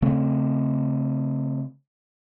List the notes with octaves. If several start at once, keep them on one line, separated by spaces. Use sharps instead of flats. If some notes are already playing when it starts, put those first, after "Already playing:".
C#3 A3 C4